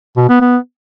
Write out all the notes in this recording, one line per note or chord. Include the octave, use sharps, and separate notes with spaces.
B2
B3
B3